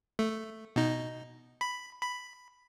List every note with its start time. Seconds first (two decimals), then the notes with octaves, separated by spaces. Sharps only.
0.19 A3
0.76 B2 D#4
1.61 B5
2.02 B5